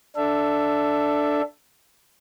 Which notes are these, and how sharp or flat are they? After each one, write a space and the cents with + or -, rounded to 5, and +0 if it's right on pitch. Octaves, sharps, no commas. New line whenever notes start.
D4 +0 A4 +0 E5 +20